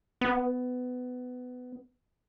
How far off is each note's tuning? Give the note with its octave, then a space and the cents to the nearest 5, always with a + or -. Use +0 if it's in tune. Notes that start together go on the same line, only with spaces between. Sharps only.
B3 +20